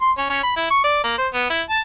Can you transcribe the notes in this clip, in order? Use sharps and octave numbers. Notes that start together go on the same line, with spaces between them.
C6
C#4
C#4
B5
E4
C#6
D5
A#3
C5
B3
E4
A5